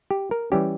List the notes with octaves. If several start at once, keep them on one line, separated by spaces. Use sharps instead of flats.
G4
A#4
E3 G3 C#4 G4